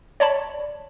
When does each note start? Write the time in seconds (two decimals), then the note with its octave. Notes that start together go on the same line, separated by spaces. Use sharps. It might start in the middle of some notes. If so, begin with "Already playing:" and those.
0.20 C#5 D5 A5 B5